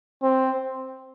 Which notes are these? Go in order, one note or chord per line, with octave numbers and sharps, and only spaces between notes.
C4